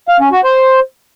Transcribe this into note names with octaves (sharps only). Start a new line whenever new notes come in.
F5
C#4
F#4
C5